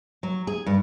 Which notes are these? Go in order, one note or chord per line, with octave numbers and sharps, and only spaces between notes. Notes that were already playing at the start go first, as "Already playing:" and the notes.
F#3
G#4
G2